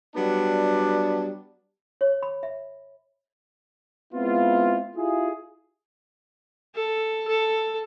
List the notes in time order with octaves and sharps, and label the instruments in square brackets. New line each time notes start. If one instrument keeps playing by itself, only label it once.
[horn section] F#3 G3 B3 D4
[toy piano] C#5
B5
E5
[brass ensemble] G#3 B3 C4 E4 F4
E4 F4 G4 G#4
[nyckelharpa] A4
A4